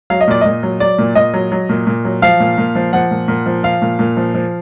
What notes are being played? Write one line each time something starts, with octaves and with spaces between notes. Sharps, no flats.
F#3 F5
D#5
A#2 D5
A#2 D#5
F#3
F#3 D5
A#2
A#2 D#5
F#3
F#3
A#2
A#2
F#3
F3 F5
A#2
A#2
F3
F3 F#5
A#2
A#2
F3
F3 F5
A#2
A#2
F3
F3